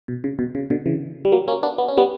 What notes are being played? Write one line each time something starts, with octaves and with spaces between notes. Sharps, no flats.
B2
C#3
B2
C#3
B2 D3
C#3 E3
G3
F#3 A#3
A#3 C#4
B3 D4
B3
C#4
G3 B3